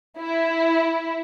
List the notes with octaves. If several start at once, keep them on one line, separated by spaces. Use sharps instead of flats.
E4